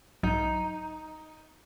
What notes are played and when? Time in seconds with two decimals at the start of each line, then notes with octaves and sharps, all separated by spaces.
0.23 B1 G#2 F#3 D#4